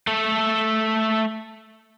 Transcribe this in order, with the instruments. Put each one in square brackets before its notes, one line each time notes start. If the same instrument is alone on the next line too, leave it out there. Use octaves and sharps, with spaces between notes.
[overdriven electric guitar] A3 A4